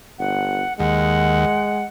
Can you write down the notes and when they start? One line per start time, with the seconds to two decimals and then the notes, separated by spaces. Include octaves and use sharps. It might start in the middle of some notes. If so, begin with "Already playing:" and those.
0.19 G1 F#5
0.79 D#2 G#3 F#5